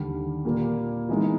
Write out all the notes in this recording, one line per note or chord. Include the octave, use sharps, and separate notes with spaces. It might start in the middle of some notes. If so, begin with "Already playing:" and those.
Already playing: D#2 D3 G3
A#2 G3 A#3
E3 G#3 B3 D#4